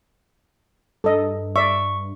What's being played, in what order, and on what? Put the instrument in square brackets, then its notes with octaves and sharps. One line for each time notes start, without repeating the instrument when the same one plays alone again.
[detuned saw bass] G2 [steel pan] A4 D#5
[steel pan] D5 E5 [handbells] C#6